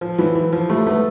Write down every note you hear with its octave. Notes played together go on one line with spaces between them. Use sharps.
F3
E3 F#3
E3
F3
G3 A3
A3 B3